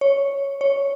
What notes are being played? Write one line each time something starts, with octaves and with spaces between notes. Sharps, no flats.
C#5
C#5